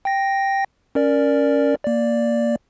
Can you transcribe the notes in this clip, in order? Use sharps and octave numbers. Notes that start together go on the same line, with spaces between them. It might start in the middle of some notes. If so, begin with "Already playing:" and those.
G5 A#6
C#4 A#4 D5
A#3 D5